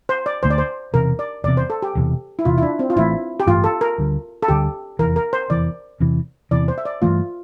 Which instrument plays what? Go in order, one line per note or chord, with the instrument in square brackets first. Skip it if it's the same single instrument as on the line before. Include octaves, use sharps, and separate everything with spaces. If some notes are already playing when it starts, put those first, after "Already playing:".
[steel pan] C5
D5
[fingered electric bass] D2 D3 A3 [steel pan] C5
[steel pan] D5
C5
[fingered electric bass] E1 E2 C3 [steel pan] A#4
[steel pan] D5
[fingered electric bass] E1 E2 C3 [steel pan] D5
[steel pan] C5
A4
G4
[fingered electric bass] E1 E2 C3
[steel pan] E4
[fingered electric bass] E1 E2 C3 [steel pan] F4
[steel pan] E4
D4
C4
F4
[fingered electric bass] A1 G2 E3 A3 [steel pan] E4
[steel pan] G4
[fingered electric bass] A1 G2 E3 A3 [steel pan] F4
[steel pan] A4
A#4
[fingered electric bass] D2 D3 G3
[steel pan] A4
[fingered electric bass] D2 D3 G3 [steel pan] G4
[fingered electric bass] F1 E2 E3 [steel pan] A#4
[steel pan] A#4
C5
[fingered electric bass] F1 E2 E3 [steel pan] D5
[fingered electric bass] E2 C3 E3
[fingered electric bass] E2 C3 E3 [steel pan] D5
[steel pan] C5
E5
D5
[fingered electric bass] G2 E3 A3 [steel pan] F4